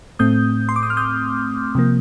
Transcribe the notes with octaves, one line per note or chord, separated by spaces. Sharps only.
A2 A3 C4 D#6 G6
C6
D6
D#6
F6
D#6 G6
C3 F3 A#3